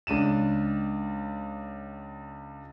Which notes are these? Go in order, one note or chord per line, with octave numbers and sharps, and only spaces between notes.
C#2 D4 D#7 E7